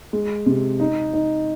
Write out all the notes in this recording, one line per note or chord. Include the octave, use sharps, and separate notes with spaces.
G#3
C3
D#4
D#4